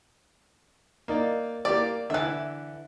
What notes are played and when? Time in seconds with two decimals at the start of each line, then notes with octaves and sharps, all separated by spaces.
1.08 A#3 D#4 D5
1.65 A#3 G4 D5 D6
2.10 D3 E3 E5 F#6